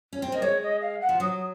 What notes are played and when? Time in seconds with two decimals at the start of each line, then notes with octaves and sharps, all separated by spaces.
0.13 C#4
0.22 C4
0.32 A#3 D#5
0.41 G#3 C#5
0.62 D#5
0.81 F5
1.01 F#5
1.09 F3
1.20 F#3 D#6